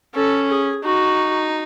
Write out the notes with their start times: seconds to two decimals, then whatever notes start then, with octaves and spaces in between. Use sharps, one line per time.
0.15 C#4 A4
0.49 G#4
0.84 D#4 F#4